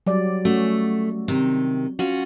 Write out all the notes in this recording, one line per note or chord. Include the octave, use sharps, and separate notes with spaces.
F#3 G3 D5
A3 C#4 F#4
C3 D#3
C#4 F4 F#4